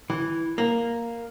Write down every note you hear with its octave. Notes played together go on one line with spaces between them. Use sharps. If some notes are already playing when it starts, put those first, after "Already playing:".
E3
A#3